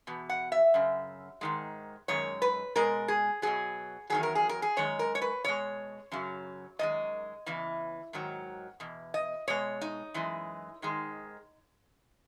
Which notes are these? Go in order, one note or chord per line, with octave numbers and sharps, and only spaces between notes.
E2 B2
F#5
E5
F#2 C#3
G#2 D#3 G#3
F#2 D#3 G#3 C#5
B4
B2 G#3 A#4
G#4
B2 F#3 G#4
E2 D#3 F#3 G#4
A#4
G#4
A#4
G#4
F#2 D#3 G#3 C#5
A#4
C#5
B4
B2 G#3 C#5
F#2 C#3 F#3
F#2 D#3 G#3 D#5
E2 C#3 E3
G#2 D#3 F#3
E2 B2
D#5
B2 G#3 C#5
D#4
F#2 E3 G#3
G#2 D#3 G#3